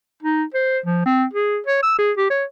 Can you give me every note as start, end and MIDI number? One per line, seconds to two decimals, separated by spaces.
0.23 0.44 63
0.55 0.79 72
0.86 1.05 53
1.06 1.25 60
1.33 1.59 68
1.66 1.79 73
1.83 1.98 88
1.99 2.12 68
2.17 2.28 67
2.30 2.44 73